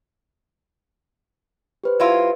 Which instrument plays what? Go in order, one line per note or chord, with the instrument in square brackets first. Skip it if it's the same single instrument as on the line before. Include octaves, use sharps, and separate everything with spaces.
[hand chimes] G4 B4 C5
[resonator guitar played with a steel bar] F#3 E4 F4